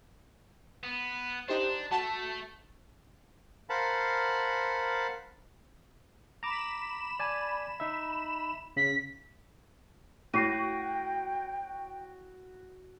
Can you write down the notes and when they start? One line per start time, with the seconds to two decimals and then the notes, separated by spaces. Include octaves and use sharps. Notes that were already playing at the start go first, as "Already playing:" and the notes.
0.83 B3
1.48 D4 D#4 G4 C5
1.91 A3 F#4 A5
3.70 A#4 C5 F5 F#5 A5 B5
6.43 A#5 B5 D6 E7
7.19 D5 G#5 A5
7.80 D#4 E5
8.77 C#3 B6
10.34 A2 F#4 G5 A#6 C7 D#7